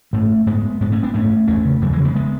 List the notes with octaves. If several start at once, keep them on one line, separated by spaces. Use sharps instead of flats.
G#2 A3 C#4
G#2 G#3 B3
G#2 G#3 B3
A3 C#4
B3 D4
G#2 A3 C#4
E2 A3 C#4
C#3
E2 F#3 A3
E3 G#3
C#3
G#3 B3
G#3 B3